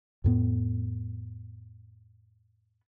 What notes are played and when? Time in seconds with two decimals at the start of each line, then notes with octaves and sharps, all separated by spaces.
0.24 F2 A2 B3